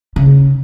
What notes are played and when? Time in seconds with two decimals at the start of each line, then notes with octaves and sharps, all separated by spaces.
0.16 C#3